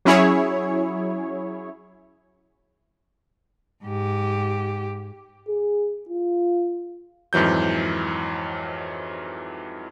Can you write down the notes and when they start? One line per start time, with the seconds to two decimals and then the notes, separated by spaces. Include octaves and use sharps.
0.05 F#3 C#4 E4 G#4 C#5
3.84 G#2 G4
5.49 G#4
6.09 F4
7.33 F2 G#2 E3 F#3 G6